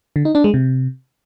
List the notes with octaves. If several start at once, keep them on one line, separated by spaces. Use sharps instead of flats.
D3
D#4
D4
G#3
C3